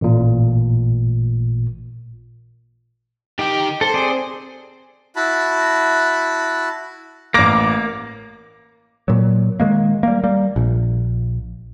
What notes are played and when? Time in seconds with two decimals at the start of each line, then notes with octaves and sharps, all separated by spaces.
0.01 A1 A#2
3.39 D#3 G4 G5
3.81 A4 C5
3.94 C4 G#4 D5
5.16 E4 F#4 A5 B5
7.34 A1 A#3 D6 A#6
9.08 A#2 F#3
9.60 D#3 G#3 A#3
10.03 G3 A#3
10.24 G3 A#3
10.56 A#1